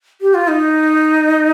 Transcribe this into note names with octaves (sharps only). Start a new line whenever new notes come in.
G4
F4
D#4